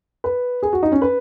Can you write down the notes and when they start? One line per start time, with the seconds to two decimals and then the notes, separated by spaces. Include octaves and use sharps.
0.24 B4
0.63 G#4
0.73 F#4
0.83 D#4
0.92 C#4
1.02 B4